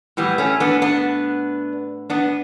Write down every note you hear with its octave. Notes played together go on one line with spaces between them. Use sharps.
A2 E3 G3 B3
A3 C#4
B3 D4
B3 D4
B3 D4